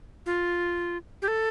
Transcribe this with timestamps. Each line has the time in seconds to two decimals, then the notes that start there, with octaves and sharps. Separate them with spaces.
0.26 F4
1.22 G4
1.28 A4